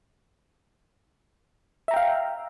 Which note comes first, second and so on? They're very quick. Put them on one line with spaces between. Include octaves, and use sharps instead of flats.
E5 A#5 G5 F5